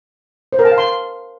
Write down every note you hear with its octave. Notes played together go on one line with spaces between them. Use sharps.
C5
A#4
A5
F5
C6